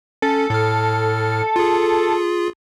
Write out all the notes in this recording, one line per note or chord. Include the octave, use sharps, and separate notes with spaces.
C#4 A4
A2 A4 F6
F4 G#4